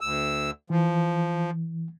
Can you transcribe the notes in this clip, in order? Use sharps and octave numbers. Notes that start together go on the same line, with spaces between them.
D2 E6
E3 F3